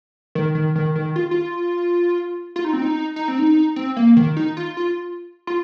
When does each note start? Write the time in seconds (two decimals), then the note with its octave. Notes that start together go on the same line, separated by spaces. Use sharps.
0.35 D#3
0.55 D#3
0.75 D#3
0.95 D#3
1.16 F4
1.31 F4
2.56 F4
2.65 D#4
2.73 C4
2.82 D#4
3.16 D#4
3.28 C4
3.39 D#4
3.76 C4
3.96 A#3
4.17 D#3
4.37 D#4
4.57 F4
4.77 F4
5.47 F4